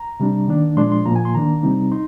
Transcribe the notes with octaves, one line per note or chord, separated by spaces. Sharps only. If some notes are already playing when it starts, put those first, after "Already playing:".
Already playing: A#5
C3 G3 D4
D#3 A#3 D4
A#2 F3 G#3 D4 C6
C6
A#2 F3 A#3 A#5
G#5
C6
D#3 A#3 D4 A#5
C3 G3 C4 D#4
D#4 C6